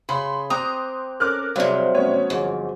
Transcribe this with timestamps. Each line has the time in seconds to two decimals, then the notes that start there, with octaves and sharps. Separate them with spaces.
0.09 C#3 B5 C6
0.50 C4 G5 A#5 C6 D6 D#6 F#6
1.20 C#4 A4 A#4 D6 F6 F#6
1.56 G2 C3 F#3 C4 G#4 C5 F5
1.95 A3 B3 C#4 C#5
2.30 G1 G#2 F3